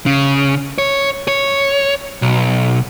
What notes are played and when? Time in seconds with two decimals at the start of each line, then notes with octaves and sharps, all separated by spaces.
0.06 C#3
0.78 C#5
1.28 C#5
2.22 B1